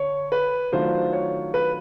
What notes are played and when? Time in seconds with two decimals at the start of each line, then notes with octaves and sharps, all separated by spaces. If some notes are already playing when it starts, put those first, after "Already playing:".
Already playing: D3 C#5
0.32 B4
0.72 D#3 F#3 A3 D4 F4 C5
1.13 C#5
1.54 B4